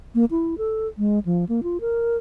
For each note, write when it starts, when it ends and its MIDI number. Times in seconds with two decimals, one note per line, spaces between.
0.15 0.25 58
0.31 0.58 64
0.58 0.88 69
0.98 1.19 56
1.25 1.45 53
1.49 1.60 58
1.63 1.78 65
1.81 2.17 70